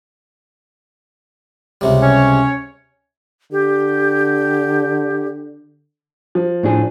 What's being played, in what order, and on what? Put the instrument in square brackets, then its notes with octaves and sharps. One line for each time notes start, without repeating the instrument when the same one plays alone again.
[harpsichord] C#2 C3 G3
[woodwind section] C#4 C#5
[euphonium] D3 [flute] G4
[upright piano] F3
[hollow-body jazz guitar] A2 D4 G#4